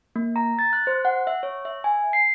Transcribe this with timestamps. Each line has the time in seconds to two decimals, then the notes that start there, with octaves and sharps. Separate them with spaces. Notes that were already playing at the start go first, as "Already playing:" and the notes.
0.16 A#3
0.36 A#5
0.59 A6
0.73 F#6
0.87 C5
1.05 F#5
1.27 E5
1.43 C#5
1.65 E5
1.84 G#5
2.13 C7